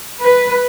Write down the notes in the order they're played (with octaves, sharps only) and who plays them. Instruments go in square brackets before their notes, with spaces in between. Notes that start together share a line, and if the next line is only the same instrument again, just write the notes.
[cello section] B4